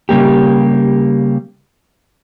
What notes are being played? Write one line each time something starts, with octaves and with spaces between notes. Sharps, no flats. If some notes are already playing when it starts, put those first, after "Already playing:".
C#3 G3 A#3 G4